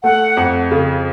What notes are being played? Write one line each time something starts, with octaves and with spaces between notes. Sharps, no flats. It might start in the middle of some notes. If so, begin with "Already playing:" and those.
A3 F#5
F2
C#3